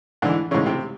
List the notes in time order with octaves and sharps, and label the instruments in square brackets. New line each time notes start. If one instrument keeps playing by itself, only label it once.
[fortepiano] G#2 D3 E3 D4
G#2 C#3 E3 C#4
C3 C4